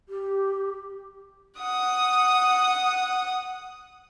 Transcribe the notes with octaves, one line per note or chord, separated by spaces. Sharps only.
G4
F#5 D#6